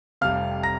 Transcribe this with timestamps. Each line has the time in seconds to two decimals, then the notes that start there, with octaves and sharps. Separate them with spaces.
0.21 F1 F2 C3 G3 F5 F6
0.63 A#5 A#6